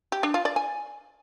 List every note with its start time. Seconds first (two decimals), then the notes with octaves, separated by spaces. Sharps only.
0.12 G4
0.23 D4
0.34 F4
0.45 D5
0.56 G#5